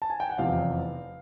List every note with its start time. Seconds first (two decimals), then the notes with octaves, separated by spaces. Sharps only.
0.02 A5
0.10 G#5
0.20 G5
0.30 F#5
0.38 F1 E2 C3 F3 F5